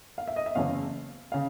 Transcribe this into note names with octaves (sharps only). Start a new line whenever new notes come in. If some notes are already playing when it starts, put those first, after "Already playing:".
F5
E5
D#5
E5
F#1 E2 C#3 F5
C#3 F5